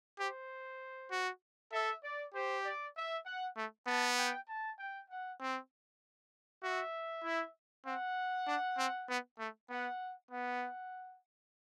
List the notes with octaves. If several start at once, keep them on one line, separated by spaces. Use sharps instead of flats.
G4 C5
F#4
A4 E5
D5
G4 C5
D5
E5
F#5
A3
B3 A5
G5
A5
G5
F#5
C4
F#4 E5
E4
C4 F#5
D4
C4
B3
A3
B3 F#5
B3 F#5